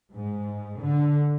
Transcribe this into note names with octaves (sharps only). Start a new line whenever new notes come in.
G#2
D3